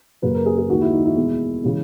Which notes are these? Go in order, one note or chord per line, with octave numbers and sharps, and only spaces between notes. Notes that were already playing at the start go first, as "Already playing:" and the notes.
F#2 C#3 F#3 A#3 B4
A#4
G#4
G#4
D#2 D#3 G#3 F#4
E4
D#4
E4
E2 B2 G#3
C#3 E3 G#3